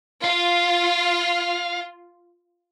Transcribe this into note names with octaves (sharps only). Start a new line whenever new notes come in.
F4 F5